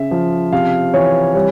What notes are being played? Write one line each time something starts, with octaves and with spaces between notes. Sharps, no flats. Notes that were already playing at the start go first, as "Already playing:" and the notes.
Already playing: C#3 E5
F3
C3 F5
E3 C#5
G3 C#5